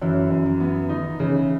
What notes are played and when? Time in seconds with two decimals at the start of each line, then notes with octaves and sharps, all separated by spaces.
0.02 F#2 E3
0.30 F#2
0.46 E3
0.60 B3
0.89 D#3 D#4
1.19 C#3 E3